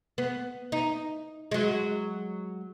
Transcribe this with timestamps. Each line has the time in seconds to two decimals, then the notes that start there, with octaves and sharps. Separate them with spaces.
0.18 B3
0.72 D#4
1.51 F#3 G#3